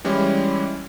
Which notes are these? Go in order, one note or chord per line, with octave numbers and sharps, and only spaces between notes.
E3 G3 G#3 C#4 E4